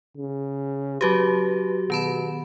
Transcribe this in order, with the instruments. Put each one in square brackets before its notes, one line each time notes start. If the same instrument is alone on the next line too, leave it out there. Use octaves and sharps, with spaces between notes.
[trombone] C#3
[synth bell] F#3 F#4 G4 [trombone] B4
[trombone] B2 [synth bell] D#3 A5 B5